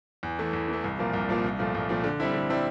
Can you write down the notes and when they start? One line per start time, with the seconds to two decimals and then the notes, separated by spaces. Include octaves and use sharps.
0.23 E2
0.39 E3 A3
0.53 E2
0.68 E3 A3
0.84 C2
0.99 A#2 F3 A#3
1.13 C2
1.29 A#2 F3 A#3
1.44 C2
1.59 A#2 F3 A3
1.75 C2
1.89 A#2 F3 A3
2.04 D3
2.20 G3 C4 E4
2.34 D3
2.50 G3 C4 E4